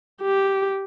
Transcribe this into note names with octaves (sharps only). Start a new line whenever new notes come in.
G4